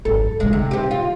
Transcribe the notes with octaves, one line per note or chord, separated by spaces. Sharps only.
G#1 F#2 A4
A2 C#3 G#3
C3 D#3
C4 G4
F4